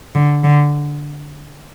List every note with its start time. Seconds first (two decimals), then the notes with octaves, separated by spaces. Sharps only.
0.15 D3
0.44 D3